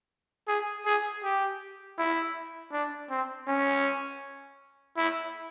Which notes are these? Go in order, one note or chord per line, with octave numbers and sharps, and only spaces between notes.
G#4
G#4
G4
E4
D4
C4
C#4
E4